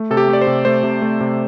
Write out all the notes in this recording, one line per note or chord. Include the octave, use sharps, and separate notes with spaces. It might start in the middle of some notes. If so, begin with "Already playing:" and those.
Already playing: A3
C3 A4
G4
A3 D5
C5
C3
A3 C5
C3
A3
C3